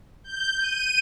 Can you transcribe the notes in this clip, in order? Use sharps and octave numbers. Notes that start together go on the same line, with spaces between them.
G6
D#7